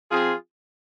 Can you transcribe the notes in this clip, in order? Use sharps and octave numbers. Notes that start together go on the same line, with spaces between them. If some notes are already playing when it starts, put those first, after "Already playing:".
F3 C4 F4 G#4